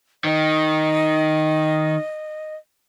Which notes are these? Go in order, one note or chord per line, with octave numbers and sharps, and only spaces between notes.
D#3 D#5